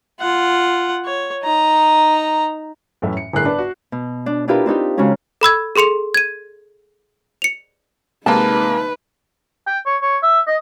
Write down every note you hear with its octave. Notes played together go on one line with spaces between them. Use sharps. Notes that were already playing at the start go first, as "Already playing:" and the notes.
F4 F#5
C#5
D#4 A#5
F#2 A2 E3 C#4 A4 E5
C#7
G1 A2 G#4 A#4 F#6 C7
D4 B4 A5
F#4
B2
D4
D4 E4 F4 G4 A#4 B4
C4 D4 D#4 G4
C#3 F#3 G#3 C#4 F4
A4 B5 E6 G#6
G#4 A4 C6 C#7 F7
G#6 D#7
C#7 F7
C3 G#3 A#3 D#4 B4 A5
G5
C#5
C#5
E5
D#5